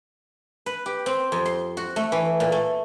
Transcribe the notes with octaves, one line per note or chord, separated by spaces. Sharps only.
B4
G4
C4
F2
C6
F#4
A3
E3
A#2
A3